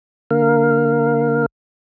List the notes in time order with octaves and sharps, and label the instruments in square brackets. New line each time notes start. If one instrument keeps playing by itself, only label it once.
[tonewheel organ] D3 A#3 A#4 F5